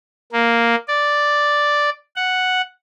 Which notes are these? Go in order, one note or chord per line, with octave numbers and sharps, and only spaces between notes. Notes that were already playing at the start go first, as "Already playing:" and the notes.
A#3
D5
F#5